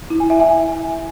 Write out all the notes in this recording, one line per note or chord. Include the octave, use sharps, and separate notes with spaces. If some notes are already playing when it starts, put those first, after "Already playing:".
E4
G#5
E5
G#5